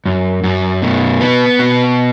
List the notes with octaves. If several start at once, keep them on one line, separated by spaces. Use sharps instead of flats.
F#2
F#2
B2
B3
B2